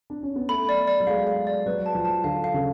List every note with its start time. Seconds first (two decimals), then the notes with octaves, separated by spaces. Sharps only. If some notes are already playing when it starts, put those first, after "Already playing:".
0.10 D4
0.23 C#4
0.36 B3
0.49 A3 B5
0.69 D5
0.87 D5
1.00 F#3
1.07 G#3 F5
1.27 F5
1.47 D5
1.66 F#3 B4
1.86 A5
1.95 F3
2.05 A5
2.24 D3 F5
2.44 F5
2.54 C#3